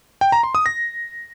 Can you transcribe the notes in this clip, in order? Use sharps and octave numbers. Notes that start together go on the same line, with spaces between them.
G5
A#5
C6
D#6
A#6